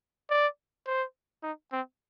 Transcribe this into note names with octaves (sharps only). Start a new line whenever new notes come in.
D5
C5
D#4
C4